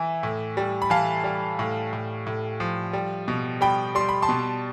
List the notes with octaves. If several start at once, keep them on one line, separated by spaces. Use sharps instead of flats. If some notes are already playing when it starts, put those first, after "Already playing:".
Already playing: E3 E5
A2
G3
B5
E3 F5 A5
G3
A2
A2
A2
F3
G3
B2
G3 G5 B5
G3 C6
B5
A5 C6
B2